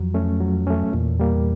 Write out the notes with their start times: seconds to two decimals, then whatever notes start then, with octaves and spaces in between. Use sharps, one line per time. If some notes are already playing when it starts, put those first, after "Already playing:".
Already playing: F2 F#3
0.14 A3 C#4
0.40 F#3
0.67 A3 C#4
0.93 E2 A#2
1.20 G3 A#3